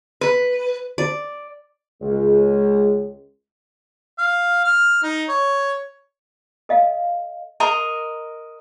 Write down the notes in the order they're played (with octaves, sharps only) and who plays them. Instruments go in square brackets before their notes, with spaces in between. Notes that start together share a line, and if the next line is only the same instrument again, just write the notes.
[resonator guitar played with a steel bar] B4
[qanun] D5
[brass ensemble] C#2 G#3
[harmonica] F5
F6
D#4
C#5
[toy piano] A4 D#5 F5
[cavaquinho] A#4 D#5 A#5 C6